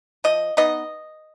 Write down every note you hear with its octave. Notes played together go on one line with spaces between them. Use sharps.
F3 D#5
B3 D#4 D#5